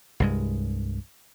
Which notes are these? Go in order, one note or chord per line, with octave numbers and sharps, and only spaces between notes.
C2 G2 G#3